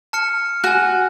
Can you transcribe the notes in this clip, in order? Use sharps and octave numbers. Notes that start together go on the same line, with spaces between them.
A5 F6 C#7
F#4 G#5 F#6